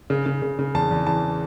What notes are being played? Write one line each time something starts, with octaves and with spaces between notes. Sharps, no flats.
C#3
C#3
C#3
C#3
E2 A5
E2
E3 A5